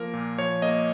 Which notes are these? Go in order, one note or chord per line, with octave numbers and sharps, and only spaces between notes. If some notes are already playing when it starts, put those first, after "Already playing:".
Already playing: F3 A#3 A#4
A#2
F3 C#5
A#3 D#5